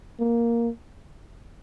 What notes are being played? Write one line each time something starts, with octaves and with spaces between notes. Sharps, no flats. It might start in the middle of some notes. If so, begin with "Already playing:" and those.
A#3